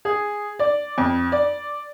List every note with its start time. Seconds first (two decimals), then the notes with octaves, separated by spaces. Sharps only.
0.05 G#4
0.59 D5
0.98 F2
1.32 D5